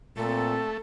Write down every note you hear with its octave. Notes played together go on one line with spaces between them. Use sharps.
A#2 A3 C4 A4